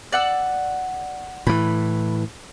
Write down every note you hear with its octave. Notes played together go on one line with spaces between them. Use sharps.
D5 F#5 E6
A2 E3 B5